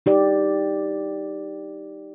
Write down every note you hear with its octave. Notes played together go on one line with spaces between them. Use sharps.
D#4 G4 D5